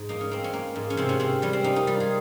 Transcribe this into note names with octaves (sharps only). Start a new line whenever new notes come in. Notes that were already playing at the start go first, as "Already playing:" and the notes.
Already playing: G#2
A#3 D#4
C#4
A#3 C4
C#4
A#3
G#2
C#4
C3 C4
C#4
C3 C4
G3 C#4
C4
A#3 D#4
D#4
G3 F4
G#4